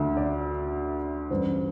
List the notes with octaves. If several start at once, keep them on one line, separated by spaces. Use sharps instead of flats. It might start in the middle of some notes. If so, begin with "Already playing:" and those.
Already playing: D2 D3 A3 E5
D5
A1 G2 D3 C5